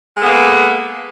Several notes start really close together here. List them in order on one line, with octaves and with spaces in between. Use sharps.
G#3 A4 B3 A#3 B4